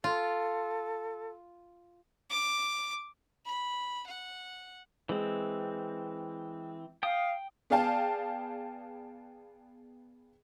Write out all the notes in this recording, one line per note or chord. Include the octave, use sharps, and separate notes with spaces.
F4 A4
D6
B5
F#5
E3 G#3 C4
F5 G5 D#6
B3 G#4 D5 F5 G5 A5